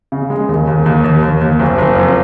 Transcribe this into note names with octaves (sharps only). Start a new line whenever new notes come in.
C#3
G#3
D#2
D#2
D#2
D#2
D#2
D#2
F#1
F#1
F2